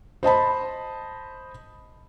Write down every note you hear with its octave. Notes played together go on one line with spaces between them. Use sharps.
C5 D#5 A5 B5